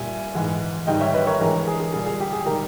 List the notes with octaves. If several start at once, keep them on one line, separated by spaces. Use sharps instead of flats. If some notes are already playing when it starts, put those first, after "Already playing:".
Already playing: A#2 G3 E5 G#5
G#2 E3 G#3
G#2 D#3 G3 D#5 G5
C#5 E5
B4 D#5
A#4 C#5
G2 E3 G#3 G4 A#4
G#4
G#4
A#2 G3 G#4
G#4
G4
G#4
D#3 G3 G4 A#4